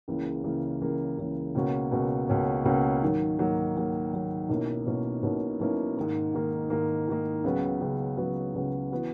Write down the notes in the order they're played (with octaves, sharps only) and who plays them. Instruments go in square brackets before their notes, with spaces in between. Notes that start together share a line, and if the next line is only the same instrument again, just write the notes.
[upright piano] C#2 C#3 E3 A#3
C#2 C#3 E3 A#3
C#2 C#3 E3 A#3
C#2 C#3 E3 A#3
C#2 B2 A#3 C#4 F#4
C#2 B2 A#3 C#4 F#4
C#2 B2 A#3 C#4 F#4
C#2 B2 A#3 C#4 F#4
G#2 D#3 F#3 A#3
G#2 D#3 F#3 A#3
G#2 D#3 F#3 A#3
G#2 D#3 F#3 A#3
B1 B2 A#3 C#4 E4
B1 B2 A#3 C#4 E4
B1 B2 A#3 C#4 E4
B1 B2 A#3 C#4 E4
G#2 D#3 A#3
G#2 D#3 A#3
G#2 D#3 A#3
G#2 D#3 A#3
C#2 C#3 F#3 B3 F#4
C#2 C#3 F#3 B3 F#4
C#2 C#3 F#3 B3 F#4
C#2 C#3 F#3 B3 F#4
E3 B3 F#4